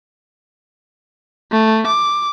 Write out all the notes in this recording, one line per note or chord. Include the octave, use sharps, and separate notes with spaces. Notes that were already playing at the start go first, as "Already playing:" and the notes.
A3
D6